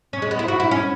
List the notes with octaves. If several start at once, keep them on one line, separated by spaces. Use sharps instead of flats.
C#4
G#3
B3
E4
F#4
E4
C#4